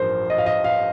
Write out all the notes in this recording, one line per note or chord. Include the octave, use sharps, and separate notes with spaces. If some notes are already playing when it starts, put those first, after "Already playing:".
Already playing: A1 G2 F3 A#4 C5
D#5
F5
D#5
F5